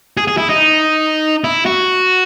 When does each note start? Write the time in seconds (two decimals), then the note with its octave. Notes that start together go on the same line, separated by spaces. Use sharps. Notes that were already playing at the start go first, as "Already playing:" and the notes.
0.17 G#4
0.27 G#4
0.37 E4
0.49 D#4
1.44 E4
1.66 F#4